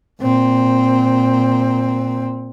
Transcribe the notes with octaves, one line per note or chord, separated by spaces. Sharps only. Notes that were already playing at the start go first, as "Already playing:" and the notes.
A#2 C4